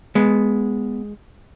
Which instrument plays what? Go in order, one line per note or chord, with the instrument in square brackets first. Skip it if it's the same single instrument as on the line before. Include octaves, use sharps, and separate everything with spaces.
[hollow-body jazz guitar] G#3 B3